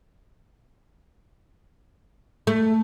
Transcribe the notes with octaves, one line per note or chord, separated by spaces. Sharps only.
A3